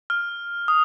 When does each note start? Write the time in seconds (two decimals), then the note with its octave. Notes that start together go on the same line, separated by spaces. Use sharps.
0.10 F6
0.68 D#6